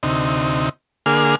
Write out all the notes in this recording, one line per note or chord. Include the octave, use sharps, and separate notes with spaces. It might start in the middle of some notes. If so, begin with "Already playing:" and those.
D2 C3 D#4
D3 A#3 G#4 F6